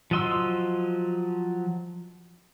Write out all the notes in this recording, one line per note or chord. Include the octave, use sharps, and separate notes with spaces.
F3 F#3 D#5 C6 E6